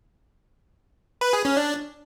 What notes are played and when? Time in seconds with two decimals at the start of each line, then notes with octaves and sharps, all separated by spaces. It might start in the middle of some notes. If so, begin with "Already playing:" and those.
1.21 B4
1.33 G#4
1.45 C#4
1.57 D4